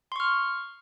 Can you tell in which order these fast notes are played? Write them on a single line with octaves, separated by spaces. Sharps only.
C6 C#6 F6